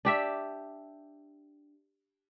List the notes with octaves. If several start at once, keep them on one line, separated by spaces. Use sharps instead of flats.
D4 G4 E5